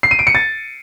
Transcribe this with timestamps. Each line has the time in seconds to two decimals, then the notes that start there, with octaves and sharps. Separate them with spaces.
0.03 C7
0.11 D#7
0.19 D7
0.27 C#7
0.35 A6